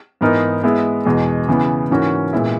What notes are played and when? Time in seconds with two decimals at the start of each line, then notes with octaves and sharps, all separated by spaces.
0.21 G#2 E3 B3 D#4 A#4
0.63 G#3 B3 E4
1.05 E2 B2 G#3
1.48 C#3 E3 B3
1.91 G#2 E3 A#3 C#4 F#4
2.33 A#2 G#3 B3 E4